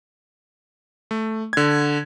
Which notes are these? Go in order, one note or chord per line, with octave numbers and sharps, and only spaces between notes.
A3
D3 G#6